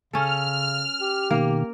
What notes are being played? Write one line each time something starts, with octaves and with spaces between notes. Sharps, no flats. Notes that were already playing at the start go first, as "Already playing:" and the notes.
C#3 C#4 A4 F6
G4
B2 D#3 A#3